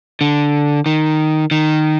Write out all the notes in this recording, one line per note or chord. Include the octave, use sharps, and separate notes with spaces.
D3
D#3
D#3